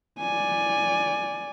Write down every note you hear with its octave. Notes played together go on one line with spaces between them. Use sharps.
D5 G#5